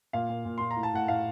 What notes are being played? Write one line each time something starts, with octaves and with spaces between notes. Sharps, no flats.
A#2 F5
A#2
A#2
A#2 C6
A#5
A2
A5
A2 F#5
A2 F5